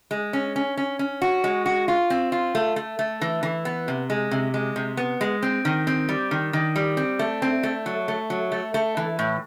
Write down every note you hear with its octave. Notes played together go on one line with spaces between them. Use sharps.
G#3
C#4
C#4
C#4
C#4
F#4
G#3
F#4
F4
C4
F4
A3
A3
A3
E3
E3
B3
C3
G#3
C3
G#3
C3
B3
G#3
C4
D#3
C4
G3
D#3
D#3
G3
C4
A3
C4
A3
F#3
A3
F#3
A3
A3
E3
A2